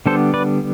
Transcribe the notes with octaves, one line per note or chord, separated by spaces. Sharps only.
D3 G3 B3 D4 A4 C5
B4 D5